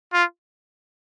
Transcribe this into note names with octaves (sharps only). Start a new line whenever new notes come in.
F4